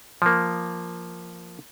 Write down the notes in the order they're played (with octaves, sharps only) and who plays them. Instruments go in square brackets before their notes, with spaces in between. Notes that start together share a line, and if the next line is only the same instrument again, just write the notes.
[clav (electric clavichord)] F3 A#3